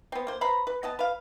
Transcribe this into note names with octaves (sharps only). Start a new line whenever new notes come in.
B3 C4
A#3 C5
B4 C5 A#5 B5
B4
B3 D#5 A5
B4 F5